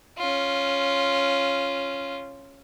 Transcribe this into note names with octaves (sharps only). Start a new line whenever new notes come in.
C#4 F4